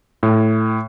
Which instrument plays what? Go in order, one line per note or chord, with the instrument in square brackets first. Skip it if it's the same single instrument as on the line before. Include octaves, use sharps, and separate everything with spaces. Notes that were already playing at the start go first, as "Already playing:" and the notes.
[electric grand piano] A2